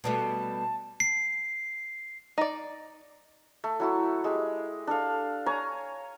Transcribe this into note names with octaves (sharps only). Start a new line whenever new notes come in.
B2 G3 A3 A5
C7
D#4 D5
A3
F#3 E4 F#4
G#3 G4
D4 A4 F5
C#5 G#5 A#5